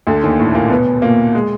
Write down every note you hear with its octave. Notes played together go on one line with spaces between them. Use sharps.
D2 D3
D#2 D#3
A2 A3
A#2 A#3
B2 B3
A#2 A#3
G#3